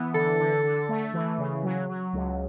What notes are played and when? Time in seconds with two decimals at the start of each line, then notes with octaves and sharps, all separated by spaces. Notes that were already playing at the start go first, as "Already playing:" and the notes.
Already playing: E3 B3
0.15 D3 A4
0.40 D3
0.64 D3
0.89 A3
1.13 E3
1.38 C#3
1.63 F#3
1.89 F#3
2.13 C#2